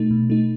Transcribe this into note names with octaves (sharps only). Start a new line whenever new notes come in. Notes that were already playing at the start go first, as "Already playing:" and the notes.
Already playing: B2 A3 D#4
B2
A3 D#4